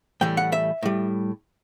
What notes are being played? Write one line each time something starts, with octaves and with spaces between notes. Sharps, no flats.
A2 E3 G3 G5
F#5
E5
A2 G3